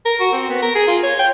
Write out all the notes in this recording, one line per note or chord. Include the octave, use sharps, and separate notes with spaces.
A#4
F#4
C4
B3
A#4
G#4
F4
C#5
G5